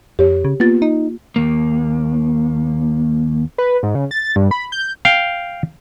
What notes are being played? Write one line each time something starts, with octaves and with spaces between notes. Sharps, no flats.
F2 G4 C#5
C#3
A#3 B3 F4 A6
D#4
D#2 A#3
B4
G#2
C#3
A6
G2
B5
G6
F5 G5